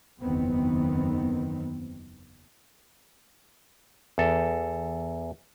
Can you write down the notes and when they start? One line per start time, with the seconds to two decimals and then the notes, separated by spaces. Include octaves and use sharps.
0.22 F#1 E2 D#3 B3 C4
4.18 E2 A4